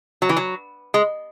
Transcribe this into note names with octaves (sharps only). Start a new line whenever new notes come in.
F#3
E3
F#3
G#3